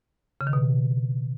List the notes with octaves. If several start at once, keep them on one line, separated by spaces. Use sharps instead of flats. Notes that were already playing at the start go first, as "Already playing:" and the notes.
C#3
D#3
B2